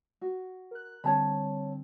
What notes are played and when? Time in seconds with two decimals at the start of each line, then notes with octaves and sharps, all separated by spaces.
0.21 F#4
0.71 A#4 F#6
1.04 D3 G3 C4 C#5 A5 B5